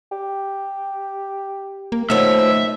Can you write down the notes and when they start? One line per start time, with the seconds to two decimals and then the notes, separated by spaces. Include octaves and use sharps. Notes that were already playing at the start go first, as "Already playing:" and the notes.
0.12 G4
1.92 A#3
2.10 D#3 F3 F#3 A3 B3 E5